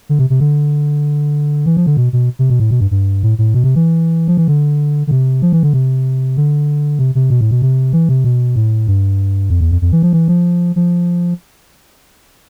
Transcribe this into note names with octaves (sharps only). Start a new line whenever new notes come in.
D3
C3
C3
D3
E3
F3
D3
B2
B2
C3
B2
A2
B2
G2
G2
A2
A2
B2
C3
E3
F3
E3
D3
D3
C3
F3
E3
D3
C3
D3
C3
C3
B2
A2
B2
C3
E3
C3
B2
A2
G2
F2
E2
F2
F2
E3
F3
E3
F3
F3